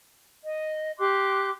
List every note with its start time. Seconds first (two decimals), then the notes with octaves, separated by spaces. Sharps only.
0.43 D#5
0.99 G4 C6 D6 F#6